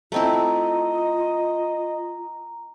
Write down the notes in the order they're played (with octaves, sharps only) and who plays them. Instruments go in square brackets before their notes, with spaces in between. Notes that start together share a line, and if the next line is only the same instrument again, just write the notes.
[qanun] A3 C4 E4 [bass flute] F4 [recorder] D#5 [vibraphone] A#5